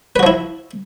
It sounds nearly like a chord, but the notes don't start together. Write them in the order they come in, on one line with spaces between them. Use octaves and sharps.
B4 F#4 F3 E4